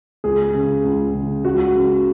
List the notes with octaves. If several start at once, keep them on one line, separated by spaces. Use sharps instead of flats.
C#2 G#4
C#3
C#2
C#3
C#2 F#4
C#3